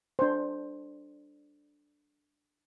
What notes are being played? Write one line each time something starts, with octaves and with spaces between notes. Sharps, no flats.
D4 C5